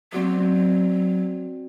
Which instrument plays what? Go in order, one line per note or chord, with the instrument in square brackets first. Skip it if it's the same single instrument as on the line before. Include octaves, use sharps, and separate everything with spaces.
[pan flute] F#3 [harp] C4 F#4 D5
[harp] C4